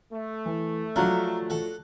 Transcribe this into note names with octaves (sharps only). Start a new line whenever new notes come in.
A3
E3
F3 F#3 D4 A#4 F5 F#6
A4 F#5